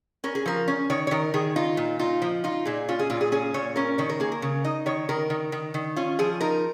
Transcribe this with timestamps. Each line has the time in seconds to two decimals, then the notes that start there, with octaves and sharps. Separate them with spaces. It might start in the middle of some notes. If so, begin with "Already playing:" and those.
0.24 C#4 A#4
0.35 G#4
0.46 F3 A#4
0.68 C#4
0.90 D#3 C#5
1.07 C#5
1.11 D#3 A#4
1.34 D#3 G#4
1.56 D#4 F4
1.77 A#2
1.99 D#4 F4
2.22 F3
2.44 D#4 F4
2.65 A#2 G#4
2.88 C#4 F4
2.99 G#4
3.10 A#2 F4
3.21 G#4
3.32 C#4 G#4
3.54 A#2 C#5
3.76 C#4 A#4
3.98 D#3 C#5
4.09 A#4
4.20 A#3 G#4
4.32 A#4
4.42 C#3
4.64 D#4 D#5
4.86 D#3 C#5
5.09 D#3 A#4
5.30 D#3
5.52 D#3
5.74 D#3
5.96 C#4 F4
6.19 F3 G#4
6.41 D#4 A#4